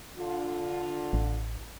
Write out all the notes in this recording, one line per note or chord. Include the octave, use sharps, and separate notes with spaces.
D3 F4
A1